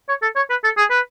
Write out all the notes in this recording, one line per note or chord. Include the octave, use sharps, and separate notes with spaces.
C#5
A4
C#5
B4
A4
G#4
B4